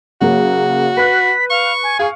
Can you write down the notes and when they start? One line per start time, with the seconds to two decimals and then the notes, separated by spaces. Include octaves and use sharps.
0.21 C#3 F#3 A#3 F#4
0.97 B4 F#6 B6
1.50 F5 C#6
1.83 G#5
1.99 G#4 F5 C#6